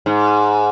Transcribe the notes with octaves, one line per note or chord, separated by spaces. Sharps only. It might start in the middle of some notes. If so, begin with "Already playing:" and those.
G#2